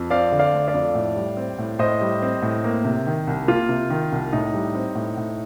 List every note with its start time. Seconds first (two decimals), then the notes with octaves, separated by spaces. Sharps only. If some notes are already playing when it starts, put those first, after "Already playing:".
Already playing: F2
0.10 C4 D5 F5
0.32 D3
0.39 D5 F5
0.53 A3
0.68 D5 F5
0.74 F2
0.95 A2
1.16 G3
1.37 C4
1.58 A2
1.79 A2 C5 D#5
2.01 G3
2.22 C4
2.42 A2
2.64 A#3
2.84 C3
3.07 D#3
3.27 C2
3.48 A#3 F4
3.69 C3
3.90 D#3
4.12 C2
4.32 A2 D#4
4.54 G3
4.75 C4
4.95 A2
5.17 A2